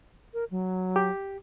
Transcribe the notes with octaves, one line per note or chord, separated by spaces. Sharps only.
A#4
F#3
G4